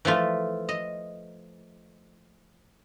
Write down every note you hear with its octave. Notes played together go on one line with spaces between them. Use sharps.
E3 F3 A3 F4
D#5